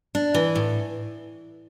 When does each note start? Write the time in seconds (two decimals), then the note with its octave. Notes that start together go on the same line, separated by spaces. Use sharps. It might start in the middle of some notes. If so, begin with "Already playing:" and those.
0.15 D4
0.34 E3
0.55 A2